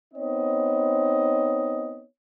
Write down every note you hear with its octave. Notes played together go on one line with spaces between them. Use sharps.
B3 C4 D#4 C#5 D#5